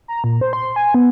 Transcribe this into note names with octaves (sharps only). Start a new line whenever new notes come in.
A#5
A#2
C5
C6
G#5
B3